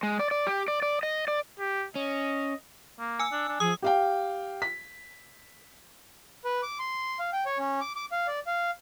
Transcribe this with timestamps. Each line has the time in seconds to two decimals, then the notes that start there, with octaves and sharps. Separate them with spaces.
0.03 G#3
0.19 D5
0.31 D5
0.47 G4
0.68 D5
0.82 D5
1.03 D#5
1.28 D5
1.59 G4
1.96 C#4 D#5
2.99 A#3
3.20 G#5 E6
3.32 D4
3.49 D4
3.60 F3 G#4 D#6
3.82 G4 F5 G5
4.62 B6
6.45 B4
6.63 D6
6.79 C6
7.19 F5
7.33 G5
7.46 C#5
7.58 C#4
7.81 D6
7.96 D6
8.12 F5
8.28 D5
8.47 F5